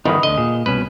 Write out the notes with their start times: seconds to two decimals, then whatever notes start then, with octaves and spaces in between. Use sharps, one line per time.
0.05 G1 E2 D#3 D#4 B4 D#5
0.23 D2 D3 D#5
0.38 A#2 G#4
0.66 C2 B2 C#4 B4